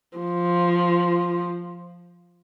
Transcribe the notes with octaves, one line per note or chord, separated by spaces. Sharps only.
F3